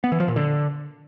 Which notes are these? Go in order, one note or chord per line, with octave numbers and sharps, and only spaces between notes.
B3
E3
F3
A#2
D3